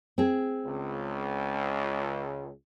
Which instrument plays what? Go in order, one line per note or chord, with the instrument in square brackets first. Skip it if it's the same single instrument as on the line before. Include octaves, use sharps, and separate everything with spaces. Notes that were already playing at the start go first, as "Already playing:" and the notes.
[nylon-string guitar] C4 G#4
[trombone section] C#2